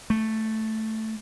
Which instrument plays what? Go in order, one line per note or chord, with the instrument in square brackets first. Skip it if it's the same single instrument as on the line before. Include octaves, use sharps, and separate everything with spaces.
[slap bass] A3